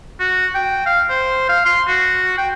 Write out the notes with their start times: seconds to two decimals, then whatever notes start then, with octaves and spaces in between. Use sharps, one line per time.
0.20 F#4
0.54 G5
0.86 F5
1.09 C5
1.49 F5
1.65 C6
1.88 F#4
2.38 G5